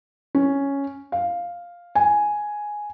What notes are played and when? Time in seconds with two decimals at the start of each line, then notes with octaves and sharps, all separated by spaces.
0.35 C#4
1.12 F5
1.95 G#5